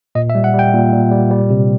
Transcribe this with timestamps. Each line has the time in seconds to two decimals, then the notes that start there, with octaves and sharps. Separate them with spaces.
0.15 A#2 D#5
0.30 E5
0.35 G3
0.44 F#5
0.54 G3 G5
0.73 A#2
0.92 A#2
1.11 G3
1.31 G3
1.50 C3